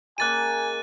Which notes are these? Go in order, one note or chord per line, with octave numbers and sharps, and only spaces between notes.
G#3 A#3 C#4 G#5 F#6 A6 D#7